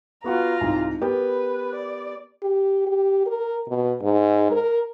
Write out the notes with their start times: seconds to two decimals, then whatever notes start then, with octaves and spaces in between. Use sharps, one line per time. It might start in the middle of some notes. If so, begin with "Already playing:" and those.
0.24 B3 F4 F#4 F#5 A#5
0.61 C2 G#2
1.02 B3 G4 A#4 B4
1.75 D5
2.43 G4
2.87 G4
3.26 A#4
3.69 B2
4.02 G#2
4.52 A#4